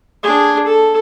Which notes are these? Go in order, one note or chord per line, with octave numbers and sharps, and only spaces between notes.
D4 G#4
A4